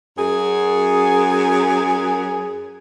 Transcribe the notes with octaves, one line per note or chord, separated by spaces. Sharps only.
F#2 G#4